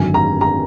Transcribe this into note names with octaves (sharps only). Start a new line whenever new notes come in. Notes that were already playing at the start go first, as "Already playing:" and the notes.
Already playing: G#1 F#2 D3 G#5
A#5
A#5